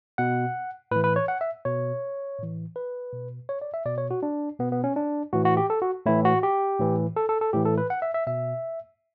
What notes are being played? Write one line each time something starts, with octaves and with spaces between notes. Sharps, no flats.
B2 F#5
A2 E3 B4
B4
C#5
F#5
E5
B2 C#5
A2 E3
B4
B2
C#5
D5
E5
B2 D5
C#5
F#4
D4
B2 B3
B3
C#4
D4
A2 E3 F#4
F#4
G4
A4
F#4
A2 E3 E4
F#4
G4
A2 E3
A4
A4
A4
A2 E3 G4
A4
B4
F#5
E5
E5
B2 E5